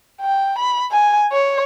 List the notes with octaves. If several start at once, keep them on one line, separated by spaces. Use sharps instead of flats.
G5
B5
G#5
C#5